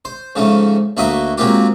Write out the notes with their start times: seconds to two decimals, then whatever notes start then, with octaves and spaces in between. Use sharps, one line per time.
0.05 C5
0.35 G#2 C#3 F3 A3
0.97 D2 A#3 F#4 D#5 E5 D#6
1.38 F#3 G#3 A#3 C4 F4 G4